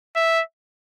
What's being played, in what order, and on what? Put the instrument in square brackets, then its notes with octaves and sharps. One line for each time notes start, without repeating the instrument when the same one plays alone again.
[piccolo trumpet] E5